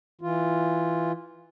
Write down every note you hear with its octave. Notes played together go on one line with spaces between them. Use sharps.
E3 F4